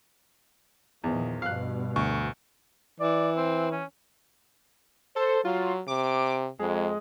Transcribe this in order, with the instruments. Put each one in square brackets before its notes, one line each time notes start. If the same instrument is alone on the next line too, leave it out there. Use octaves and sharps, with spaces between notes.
[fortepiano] E2 [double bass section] A#2 D#3 F3
[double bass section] G2 B2 [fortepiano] F5 F#6
[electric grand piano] D2 C#6
[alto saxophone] E3 [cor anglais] D5
[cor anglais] C4
C#4
[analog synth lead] A4 [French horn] C5
[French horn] F#3 [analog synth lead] F4
[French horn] C3 [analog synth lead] D6
[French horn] F2 [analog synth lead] G#3